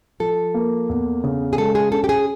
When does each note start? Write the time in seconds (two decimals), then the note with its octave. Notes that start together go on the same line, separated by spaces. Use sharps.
0.20 F3 A4
0.54 A#3
0.89 E2
1.24 C#3
1.53 G#4
1.58 G#3 A4
1.75 G#4
1.92 C#4 A4
2.04 G4
2.09 G#4